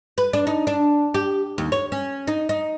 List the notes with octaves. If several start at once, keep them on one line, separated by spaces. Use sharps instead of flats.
B4
D4
D#4
D4
G4
D#2
C#5
C#4
D#4
D#4